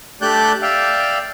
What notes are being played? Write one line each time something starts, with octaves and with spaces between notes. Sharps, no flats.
A3 D4 G4 D5 F#6 G6
D5 E5 F5 G5